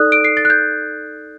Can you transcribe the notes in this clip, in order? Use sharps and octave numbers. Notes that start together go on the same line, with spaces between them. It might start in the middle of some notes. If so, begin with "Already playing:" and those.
Already playing: D#4 A4 D5 D#6 F#6
D7
C7
A6
F#6
G6